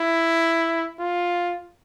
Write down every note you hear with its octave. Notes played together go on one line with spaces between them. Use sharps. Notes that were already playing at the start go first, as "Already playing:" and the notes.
Already playing: E4
F4